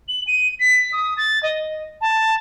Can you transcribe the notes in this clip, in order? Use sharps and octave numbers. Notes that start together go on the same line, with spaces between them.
F#7
D#7
B6
D#6
A6
D#5
A5